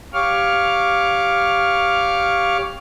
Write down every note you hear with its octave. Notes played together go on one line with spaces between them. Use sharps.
G4 C#5 F5 C#6 D6 F6